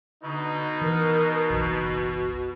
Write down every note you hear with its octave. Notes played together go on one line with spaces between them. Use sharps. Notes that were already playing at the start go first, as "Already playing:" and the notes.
B2 D3 D#4
E3 A#4
F#1 B1 E3 F#4